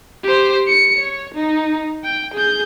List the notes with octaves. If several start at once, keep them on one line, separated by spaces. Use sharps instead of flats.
G4 C5
C#7
C#5
D#4
G5
G#4 G6